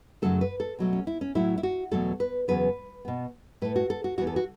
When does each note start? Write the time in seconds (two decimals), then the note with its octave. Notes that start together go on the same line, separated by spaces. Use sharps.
0.22 F#2 C#3 F#3 A3 A4
0.41 B4
0.60 A4
0.79 B2 F#3 A3
0.93 C#4
1.07 E4
1.21 C#4
1.35 A2 F#3 A3 E4
1.58 E4
1.63 F#4
1.91 E2 B2 F#3 A3 A4
2.20 B4
2.48 E2 C#3 F#3 B3 B4
3.05 B2 B3
3.62 A2 A3 B4
3.76 F#4
3.90 A4
4.04 F#4
4.18 E2 E3 B3 F#4
4.27 A4
4.36 F#4